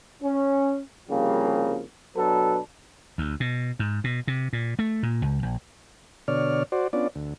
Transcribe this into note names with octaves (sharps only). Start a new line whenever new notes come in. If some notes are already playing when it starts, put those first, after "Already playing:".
C#4
C2 C#3 F3 G3 A#3
B2 F#3 D4 A4 B4
D2
B2
G#2
B2
C3
A#2
A3
A#2
C#2
A#1
B2 D3 C#5 D5 F6
F#4 C5 D5
B3 C#4 D4 F4 D5
D2